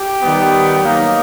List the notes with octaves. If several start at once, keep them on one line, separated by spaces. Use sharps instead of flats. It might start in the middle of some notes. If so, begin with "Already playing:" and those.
Already playing: G4
D#3 G3 B3
F#3 A#3 D#4